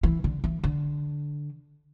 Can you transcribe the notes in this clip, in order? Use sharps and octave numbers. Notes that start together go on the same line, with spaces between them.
E3
D3
E3
D3